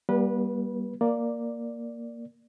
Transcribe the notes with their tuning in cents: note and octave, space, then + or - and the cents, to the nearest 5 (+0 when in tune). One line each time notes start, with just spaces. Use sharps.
G3 +0 A#3 +40 B4 -20
A#3 +0 D5 +0